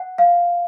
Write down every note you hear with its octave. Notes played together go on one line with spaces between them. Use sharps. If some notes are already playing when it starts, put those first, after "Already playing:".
Already playing: F#5
F5